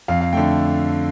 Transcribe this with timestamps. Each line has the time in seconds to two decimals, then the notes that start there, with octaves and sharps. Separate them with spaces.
0.08 F2 F5
0.21 F5
0.33 D3 A3 G5